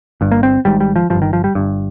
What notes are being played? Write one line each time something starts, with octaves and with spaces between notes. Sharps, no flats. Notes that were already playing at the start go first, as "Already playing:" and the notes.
G1 G2
A#3
C4
G#1 G#2 G3
G3
F3
G2 F3
G1
D#3
F3
G3
G1 G2